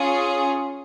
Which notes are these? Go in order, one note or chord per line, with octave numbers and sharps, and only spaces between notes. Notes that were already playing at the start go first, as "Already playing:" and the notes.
Already playing: C#4 F4 G#4